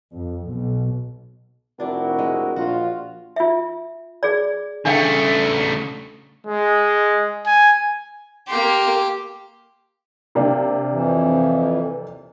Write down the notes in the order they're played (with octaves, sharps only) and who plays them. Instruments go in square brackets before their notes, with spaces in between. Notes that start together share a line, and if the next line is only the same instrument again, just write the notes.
[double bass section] F2
B1
[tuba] F1 [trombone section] C4 E4 F#4 [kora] D4 D5 [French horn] A#4
[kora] G#3
[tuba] A#1 [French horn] F4 [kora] F#4
[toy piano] F4 E5
G#4 D5
[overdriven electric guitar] C#3 A3 [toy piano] D4 F5 G5
[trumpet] G#3
G#5
[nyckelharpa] A#3 C6 [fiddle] G4
[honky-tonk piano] C3 A#3 D4
[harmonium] F2 E3